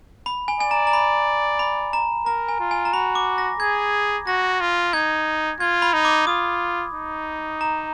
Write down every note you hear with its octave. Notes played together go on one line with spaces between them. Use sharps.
B5
G#5
D5 G#5
A#5
A#5
B5
B5
A#5
A#4 A#5
G#5
F4
G#5
A#5
F#4 B5
D6
A#6
G#4 G#6
F#4 A#6
F4
D#4 G#6
F4 G#6
B5
D#4
D6
F4 D#6
D#4
A#5